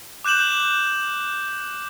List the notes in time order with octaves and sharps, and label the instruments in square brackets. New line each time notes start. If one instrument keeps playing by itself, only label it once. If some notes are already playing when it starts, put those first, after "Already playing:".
[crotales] D6 F#6 G6 E7 F#7